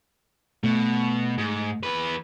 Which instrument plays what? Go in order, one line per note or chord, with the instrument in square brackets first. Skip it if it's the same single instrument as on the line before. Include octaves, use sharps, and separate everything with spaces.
[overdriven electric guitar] B2 [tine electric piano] A3
[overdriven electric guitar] G#2
E2 B4